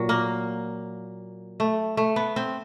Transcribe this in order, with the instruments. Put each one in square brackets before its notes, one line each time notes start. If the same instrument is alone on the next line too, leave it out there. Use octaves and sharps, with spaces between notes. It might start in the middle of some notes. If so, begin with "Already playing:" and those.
Already playing: [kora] A#2 F#3
A#3
A3
A3
B3
C4